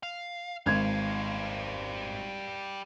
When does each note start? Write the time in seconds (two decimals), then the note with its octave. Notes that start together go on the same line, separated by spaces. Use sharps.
0.03 F5
0.66 G#1 G3 F5 G#6